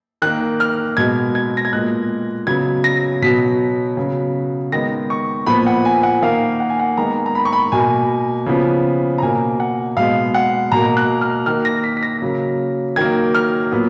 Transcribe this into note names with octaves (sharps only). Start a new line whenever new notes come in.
D#3 A#3 F#6
F6
B2 G#3 B3 G#6
G#6
A#6
G#6
A#2 G#3 B3 F#6
C#3 F#3 B3 G#6
A#6
B2 F#3 B3 B6
C#3 F#3 B3
D#3 G#3 B3 A#6
C#6
A#2 F3 B3 B5
F#5
G#5
F#5
D#3 A#3 F5
F#5
G#5
F#5
D#3 G#3 B3 A#5
A#5
B5
C#6
B5
B2 A#3 G#5
C#3 F3 B3
A#5
B2 A#3 G#5
F#5
B2 G#3 B3 F5
F#5
B2 A#3 A#5
F#6
F6
D#3 A#3 F6
A#6
B6
B6
A#6
C#3 F#3 A#3
D#3 F#3 A#3 G#6
F6
A#2 F#3 B3